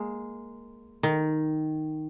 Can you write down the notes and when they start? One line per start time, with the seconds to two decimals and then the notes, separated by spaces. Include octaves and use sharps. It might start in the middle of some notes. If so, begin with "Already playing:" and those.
Already playing: G#3 A#3
1.03 D#3